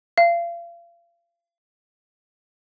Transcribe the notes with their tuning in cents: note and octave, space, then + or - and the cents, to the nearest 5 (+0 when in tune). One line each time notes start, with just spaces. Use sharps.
F5 -35